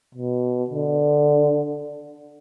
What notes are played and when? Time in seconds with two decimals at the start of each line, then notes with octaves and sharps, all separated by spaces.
0.15 B2
0.70 D3